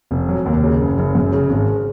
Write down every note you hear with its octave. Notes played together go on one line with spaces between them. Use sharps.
F1
F#3
D#2
C#3
F#1
F#1
F#2
C#3
G#1